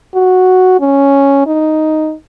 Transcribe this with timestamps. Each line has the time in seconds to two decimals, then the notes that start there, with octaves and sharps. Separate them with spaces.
0.15 F#4
0.80 C#4
1.46 D#4